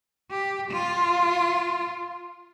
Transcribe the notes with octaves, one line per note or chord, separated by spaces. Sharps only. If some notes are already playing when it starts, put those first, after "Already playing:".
G4
F4